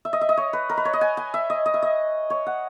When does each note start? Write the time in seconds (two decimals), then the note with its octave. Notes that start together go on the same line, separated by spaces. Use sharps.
0.05 E5
0.13 D#5
0.21 E5
0.29 D#5
0.37 C#5
0.53 B4
0.70 A#4
0.77 B4
0.85 C#5
0.93 D#5
1.01 G#5
1.17 G#5
1.34 E5
1.50 D#5
1.66 D#5
1.74 E5
1.82 D#5
2.30 C#5
2.46 F#5